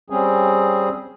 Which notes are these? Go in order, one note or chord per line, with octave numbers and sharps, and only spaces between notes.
G3 C4 C#4 G#4